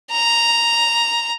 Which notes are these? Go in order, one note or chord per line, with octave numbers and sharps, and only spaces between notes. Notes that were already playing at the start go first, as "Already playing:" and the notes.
A#5